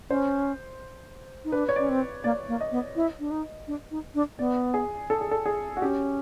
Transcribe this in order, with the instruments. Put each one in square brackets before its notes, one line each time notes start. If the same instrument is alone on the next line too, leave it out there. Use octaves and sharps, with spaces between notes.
[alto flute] C#4 [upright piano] C5
[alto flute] D#4
[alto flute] D4 [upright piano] B4
[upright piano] C#5
[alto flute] C#4 [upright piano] D5
[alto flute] C4
[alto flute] A#3 [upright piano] D5
[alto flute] A#3
[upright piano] D#5
[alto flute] B3
E4
D4
D#4
D4
D#4
D4
[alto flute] B3 [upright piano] D5
[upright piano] G#4
A4
G#4
A4
G#4
F#4
[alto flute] C#4 [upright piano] G4